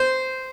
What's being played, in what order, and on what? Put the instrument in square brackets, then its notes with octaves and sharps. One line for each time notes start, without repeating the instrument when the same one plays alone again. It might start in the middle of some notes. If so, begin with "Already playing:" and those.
Already playing: [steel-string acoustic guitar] C5